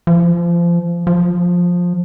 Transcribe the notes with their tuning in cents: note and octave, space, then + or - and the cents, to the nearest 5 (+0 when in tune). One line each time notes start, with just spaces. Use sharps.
F3 -25
F3 +15